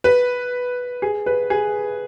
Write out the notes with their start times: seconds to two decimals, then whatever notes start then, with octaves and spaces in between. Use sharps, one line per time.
0.04 B4
1.02 G#4
1.26 B4
1.50 G#4